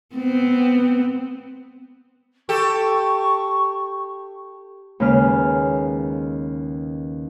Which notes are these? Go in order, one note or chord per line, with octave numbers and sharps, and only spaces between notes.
B3 C4
G4 A4 C#6
D#2 C#3 G#3 B4 F6